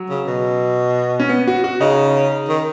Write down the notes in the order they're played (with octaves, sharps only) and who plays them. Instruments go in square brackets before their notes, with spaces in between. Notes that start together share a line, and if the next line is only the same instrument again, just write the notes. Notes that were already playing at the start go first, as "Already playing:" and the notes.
Already playing: [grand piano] F#3
[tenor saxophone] C#3
B2
[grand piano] C#4
B3
F#4
F#4
[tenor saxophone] C#3 [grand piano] D#4
[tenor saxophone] D#3